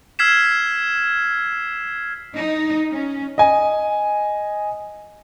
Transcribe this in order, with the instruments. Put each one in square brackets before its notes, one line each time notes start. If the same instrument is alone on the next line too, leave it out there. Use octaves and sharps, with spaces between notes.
[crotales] E6 F6 G#6 B6 C7 E7
[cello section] D#4
C#4
[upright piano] D#5 G#5